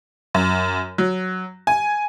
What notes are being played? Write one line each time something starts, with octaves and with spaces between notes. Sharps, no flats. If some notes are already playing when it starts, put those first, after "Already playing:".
F#2
F#3
G#5